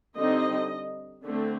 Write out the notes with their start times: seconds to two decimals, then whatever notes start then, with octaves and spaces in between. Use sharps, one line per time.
0.16 D3 G3 C4 D#4 D#5
1.24 D3 A3 C4